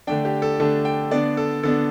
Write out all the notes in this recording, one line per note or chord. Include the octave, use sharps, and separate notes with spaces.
D3 A3 D4 G5
G4
A4
D3 A3 D4 A4
G5
D3 B3 D4 D5
A4
D3 B3 D4 A4